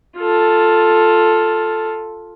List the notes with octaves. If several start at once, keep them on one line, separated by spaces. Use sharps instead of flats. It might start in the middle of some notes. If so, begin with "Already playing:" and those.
F4 A4